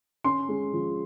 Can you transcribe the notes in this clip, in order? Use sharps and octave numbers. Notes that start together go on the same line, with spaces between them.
C#4 C6
G#3
F3